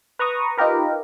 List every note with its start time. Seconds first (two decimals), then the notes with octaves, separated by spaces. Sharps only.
0.19 B4 A#5 C#6 D#6
0.58 D#4 F4 G4 A#4 B4